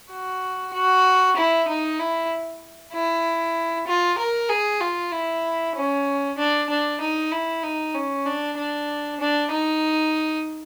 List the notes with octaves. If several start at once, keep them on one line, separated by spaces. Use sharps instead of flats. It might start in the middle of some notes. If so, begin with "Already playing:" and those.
F#4
F#4
E4
D#4
E4
E4
F4
A#4
G#4
F4
E4
C#4
D4
D4
D#4
E4
D#4
C#4
D4
D4
D4
D#4